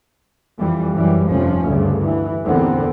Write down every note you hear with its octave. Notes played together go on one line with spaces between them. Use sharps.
F2 E3 G3
F#2 E3 G3
F1 G2 F3 C#4
D2 G2 C#3
E3
E2 A#2 D3 B3 C4